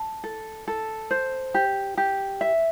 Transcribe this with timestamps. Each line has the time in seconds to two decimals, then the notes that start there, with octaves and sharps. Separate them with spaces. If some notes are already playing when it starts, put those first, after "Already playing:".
Already playing: A5
0.24 A4
0.68 A4
1.11 C5
1.54 G4
1.97 G4
2.41 E5